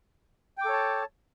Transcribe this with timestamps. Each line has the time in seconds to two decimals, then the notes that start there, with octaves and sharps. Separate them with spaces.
0.58 G5
0.62 D6
0.65 A4
0.69 C#5
0.73 A5